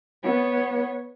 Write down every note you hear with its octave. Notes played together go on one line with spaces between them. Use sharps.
B3 C#5